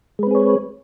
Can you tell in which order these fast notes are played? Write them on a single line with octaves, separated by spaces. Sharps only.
G#3 B4 C4 G#4 C#5